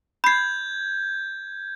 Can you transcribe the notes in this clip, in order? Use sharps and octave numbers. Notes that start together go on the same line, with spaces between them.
B5 G6 G#6 C7